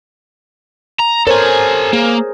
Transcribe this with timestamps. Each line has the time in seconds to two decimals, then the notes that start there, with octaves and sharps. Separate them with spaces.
1.00 A#5
1.27 A4 A#4 C5 C#5 G#5
1.93 A#3 G#4